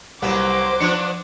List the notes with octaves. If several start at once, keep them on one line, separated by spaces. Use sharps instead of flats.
C2 F#3 A#3 B3 C5 D6
F3 B3 D4 C#7